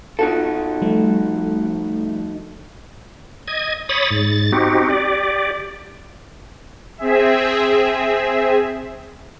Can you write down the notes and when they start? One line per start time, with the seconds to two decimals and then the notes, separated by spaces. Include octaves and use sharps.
0.19 D#4 F4 F#4 A4
0.82 F3 G3 A3
3.48 D#5 G#6
3.89 C#5 B5 D#6 A6
4.11 G#2 A6
4.52 C4 D#4 F#4 G4
4.90 G4 D5
6.98 C4 G#4 E5